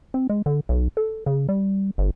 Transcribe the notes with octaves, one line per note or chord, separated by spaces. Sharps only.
C4
G#3
D3
B1
A4
C#3
G3
G1